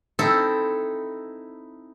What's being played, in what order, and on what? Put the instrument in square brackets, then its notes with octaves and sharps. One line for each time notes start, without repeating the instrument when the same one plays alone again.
[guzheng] C4 D#4 E4 A4